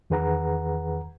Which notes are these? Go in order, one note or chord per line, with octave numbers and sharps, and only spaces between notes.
E2 D#3 G#4 B4 F#5 A#5